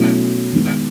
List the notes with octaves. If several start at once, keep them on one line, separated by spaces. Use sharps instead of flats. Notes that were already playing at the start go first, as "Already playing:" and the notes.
Already playing: B2 F#3 A3 C#4 E4
D#3 G#3 B3